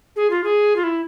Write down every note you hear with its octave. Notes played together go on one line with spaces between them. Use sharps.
G#4
F4
G#4
F4
E4